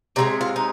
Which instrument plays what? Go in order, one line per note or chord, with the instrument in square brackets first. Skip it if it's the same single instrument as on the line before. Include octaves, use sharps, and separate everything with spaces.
[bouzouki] C3 F3 G#3 D#4
F4
D#4